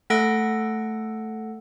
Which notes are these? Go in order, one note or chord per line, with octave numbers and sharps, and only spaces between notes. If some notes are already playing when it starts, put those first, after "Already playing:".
A3 A4 F#5 A#6 D7